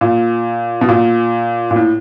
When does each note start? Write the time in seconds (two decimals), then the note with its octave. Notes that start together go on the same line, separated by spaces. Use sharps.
0.01 A#2
0.81 B2
0.89 A#2
1.71 A#2
1.76 A2